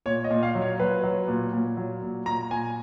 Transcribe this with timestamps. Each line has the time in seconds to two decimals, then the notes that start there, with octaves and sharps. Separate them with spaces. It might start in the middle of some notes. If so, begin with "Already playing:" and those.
0.06 A#2 C#5
0.24 D#5
0.31 A#2
0.43 F5
0.55 F#3
0.62 C#5
0.80 F#3 B4
1.04 F#3
1.28 A#2
1.53 A#2
1.77 F#3
2.02 A#2
2.26 A#2 A#5
2.51 A#2 G#5